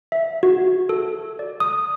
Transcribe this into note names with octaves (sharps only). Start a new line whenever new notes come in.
E5
F#4
A4
D5
D#6